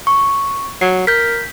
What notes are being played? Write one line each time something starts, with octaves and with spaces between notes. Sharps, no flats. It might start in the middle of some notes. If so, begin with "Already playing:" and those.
C#6
F#3 C7
A#4 G6 B6